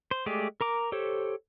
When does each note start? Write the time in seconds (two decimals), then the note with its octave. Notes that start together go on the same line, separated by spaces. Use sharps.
0.11 C5
0.26 G#3 A3 G4 G#4 D5
0.61 A#4 A#5 D6
0.92 G4 A4 C5 C#5